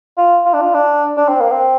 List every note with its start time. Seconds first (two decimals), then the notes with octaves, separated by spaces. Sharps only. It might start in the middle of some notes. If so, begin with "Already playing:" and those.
0.17 F4
0.46 F4
0.53 D4
0.61 F4
0.74 D4
1.17 D4
1.28 C4
1.40 A#3
1.52 C4